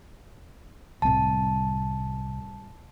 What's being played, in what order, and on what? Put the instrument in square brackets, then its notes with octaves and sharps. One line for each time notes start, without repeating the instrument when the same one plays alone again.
[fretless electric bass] C2 C4 [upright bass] A2 G3 [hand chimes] A5